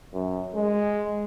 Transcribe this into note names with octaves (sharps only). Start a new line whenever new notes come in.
F#2
G#3